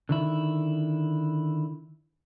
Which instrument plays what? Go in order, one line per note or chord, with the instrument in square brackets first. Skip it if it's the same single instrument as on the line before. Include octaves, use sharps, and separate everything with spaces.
[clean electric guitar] D3 D#3 E4